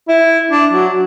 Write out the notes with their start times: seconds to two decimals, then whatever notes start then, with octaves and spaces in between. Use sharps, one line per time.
0.09 E4
0.51 D4
0.73 F#3